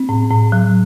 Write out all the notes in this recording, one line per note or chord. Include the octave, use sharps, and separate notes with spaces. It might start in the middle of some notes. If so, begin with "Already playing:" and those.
Already playing: C4
A2
A2
F#3